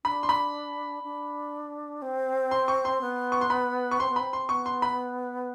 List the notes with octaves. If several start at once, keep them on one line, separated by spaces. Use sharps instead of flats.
D4 B5
C6
B5
D4
C4
C6
C#6
C6
B3
C#6
C6
B5
C#6
C4 C6
B3
C4 B5
C6
B3 C#6
C6
B5